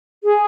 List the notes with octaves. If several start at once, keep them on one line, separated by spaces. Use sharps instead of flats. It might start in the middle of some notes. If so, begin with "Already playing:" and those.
G#4